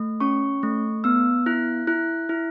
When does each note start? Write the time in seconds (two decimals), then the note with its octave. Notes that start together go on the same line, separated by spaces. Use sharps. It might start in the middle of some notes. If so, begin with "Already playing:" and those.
Already playing: A3
0.20 C#4 C#6
0.63 A3
1.04 B3 E6
1.46 E4 F#6
1.87 E4 F#6
2.29 E4